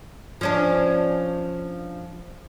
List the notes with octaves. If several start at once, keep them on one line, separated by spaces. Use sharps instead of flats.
F3 C#4 D4